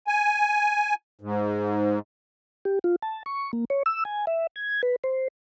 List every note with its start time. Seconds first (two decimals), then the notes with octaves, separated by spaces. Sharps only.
0.07 G#5
1.21 G#2
2.65 G4
2.84 F4
3.02 A5
3.26 C#6
3.53 A#3
3.70 C#5
3.86 E6
4.05 G#5
4.27 E5
4.56 G#6
4.83 B4
5.04 C5